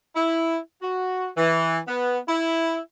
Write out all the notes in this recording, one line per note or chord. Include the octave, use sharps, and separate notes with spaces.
E4
F#4
E3
B3
E4